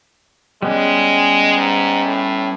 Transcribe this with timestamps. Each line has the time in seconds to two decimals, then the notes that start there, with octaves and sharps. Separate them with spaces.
0.62 G3 G#3 B3 C#4
1.57 G#2
2.05 A2